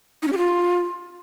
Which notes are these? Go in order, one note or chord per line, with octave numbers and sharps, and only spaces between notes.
D#4
C#4
G4
F4